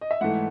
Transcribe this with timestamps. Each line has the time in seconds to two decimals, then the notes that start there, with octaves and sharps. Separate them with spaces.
0.01 D#5
0.11 E5
0.21 G#2 E3 A3 F#5